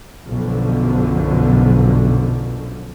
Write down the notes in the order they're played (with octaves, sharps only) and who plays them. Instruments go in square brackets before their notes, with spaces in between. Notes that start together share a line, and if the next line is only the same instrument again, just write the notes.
[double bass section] B1 F#2 B2 D3 F3